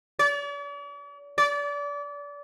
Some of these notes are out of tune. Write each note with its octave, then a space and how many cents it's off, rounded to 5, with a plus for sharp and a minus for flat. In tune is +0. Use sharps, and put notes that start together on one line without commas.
D5 -45
D5 -30